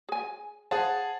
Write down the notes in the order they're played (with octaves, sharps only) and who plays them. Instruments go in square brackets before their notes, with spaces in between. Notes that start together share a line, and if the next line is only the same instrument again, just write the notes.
[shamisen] G#4 G#5
[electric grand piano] G#4 F#5 A5 [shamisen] C5 F5 B5